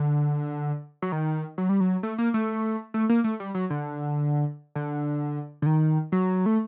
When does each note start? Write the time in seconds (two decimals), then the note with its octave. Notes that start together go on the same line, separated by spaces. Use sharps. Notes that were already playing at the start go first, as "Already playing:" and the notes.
Already playing: D3
1.02 F#3
1.12 D#3
1.58 F#3
1.69 G3
1.80 F#3
2.03 A3
2.18 A#3
2.34 A3
2.94 A3
3.09 A#3
3.24 A3
3.40 G3
3.55 F#3
3.70 D3
4.75 D3
5.62 D3
5.66 D#3
6.12 F#3
6.46 A3